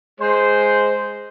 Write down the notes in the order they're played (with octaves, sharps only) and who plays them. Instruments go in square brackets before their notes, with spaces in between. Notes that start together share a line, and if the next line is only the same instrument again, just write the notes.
[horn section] G#3 C5